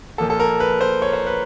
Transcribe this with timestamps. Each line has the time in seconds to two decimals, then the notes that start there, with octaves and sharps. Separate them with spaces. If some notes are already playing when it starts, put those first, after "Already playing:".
0.18 A#2 F3 A#3 A4
0.30 A4
0.40 A#4
0.60 B4
0.81 C5
1.02 C#5
1.13 C5
1.27 B4